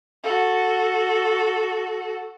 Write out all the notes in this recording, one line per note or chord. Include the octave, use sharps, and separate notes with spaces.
F#4 A4